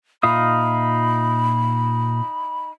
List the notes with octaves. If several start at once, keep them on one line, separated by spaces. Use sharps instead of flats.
A#2 D#4 F4 E5 F5 B5 D#6